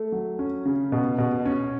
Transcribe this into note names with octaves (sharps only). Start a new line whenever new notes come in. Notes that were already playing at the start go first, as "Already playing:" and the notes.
Already playing: A3
F#3
C#4
C#3
B2
B2
C#4